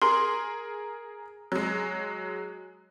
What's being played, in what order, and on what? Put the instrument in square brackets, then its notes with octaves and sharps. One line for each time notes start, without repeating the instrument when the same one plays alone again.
[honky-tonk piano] G#4 A#4 [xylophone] C6
[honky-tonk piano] F#3 G#3